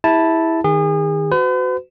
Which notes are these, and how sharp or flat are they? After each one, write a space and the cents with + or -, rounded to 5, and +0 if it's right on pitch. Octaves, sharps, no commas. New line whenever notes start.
E4 -10 G#4 -40 A5 +0
D#3 +0 G#4 -35
F#4 +0 B4 +45